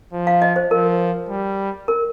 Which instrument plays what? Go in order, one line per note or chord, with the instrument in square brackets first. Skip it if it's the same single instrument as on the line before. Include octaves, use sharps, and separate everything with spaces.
[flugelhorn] F3
[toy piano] F5
D#5
C5
[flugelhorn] F3 [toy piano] A#4
[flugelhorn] G3
[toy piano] A#4